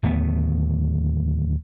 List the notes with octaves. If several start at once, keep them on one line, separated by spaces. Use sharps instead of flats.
D1 D#2 A3 B3